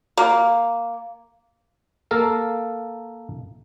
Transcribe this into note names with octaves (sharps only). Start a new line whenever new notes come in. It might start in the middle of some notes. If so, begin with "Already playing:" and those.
A#3
A#3 A4 A#4 F5